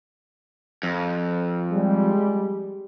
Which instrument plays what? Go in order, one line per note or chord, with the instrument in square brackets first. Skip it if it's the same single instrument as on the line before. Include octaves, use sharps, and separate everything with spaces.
[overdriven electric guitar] F2
[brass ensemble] G3 G#3